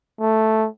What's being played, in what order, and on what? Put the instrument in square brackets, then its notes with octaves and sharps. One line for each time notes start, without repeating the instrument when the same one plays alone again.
[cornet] A3